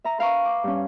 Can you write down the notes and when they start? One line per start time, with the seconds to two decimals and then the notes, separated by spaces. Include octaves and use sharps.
0.04 E5 A#5
0.19 B4 F5 A#5 C#6
0.45 D6
0.64 G2 C#4